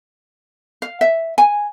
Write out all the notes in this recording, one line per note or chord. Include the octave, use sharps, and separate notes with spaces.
F5
E5
G#5